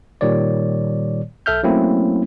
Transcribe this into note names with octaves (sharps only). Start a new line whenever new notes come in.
A#2 D#3 G3 C#5 D5
B1 A4 E5 F6 G6
F#3 A3 A#3 C4 C#4 E4